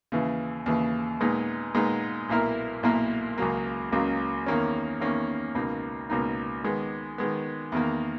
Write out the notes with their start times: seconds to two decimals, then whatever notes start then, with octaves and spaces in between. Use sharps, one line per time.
0.12 D#2 C#3 E3
0.66 D#2 C#3 E3
1.21 A#2 G#3 B3 D#4
1.75 A#2 G#3 B3 D#4
2.29 B1 A#2 A#3 E4 A#4
2.83 B1 A#2 A#3 E4 A#4
3.38 C#2 C#3 F#3 A#3
3.92 C#2 C#3 F#3 A#3
4.46 E2 D#3 A#3 C#4
5.00 E2 D#3 A#3 C#4
5.55 C#2 B2 A#3 D#4
6.10 C#2 B2 A#3 D#4
6.64 D#3 G#3 B3
7.18 D#3 G#3 B3
7.72 E2 D#3 A#3